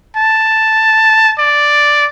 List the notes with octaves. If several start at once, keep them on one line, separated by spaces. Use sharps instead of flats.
A5
D5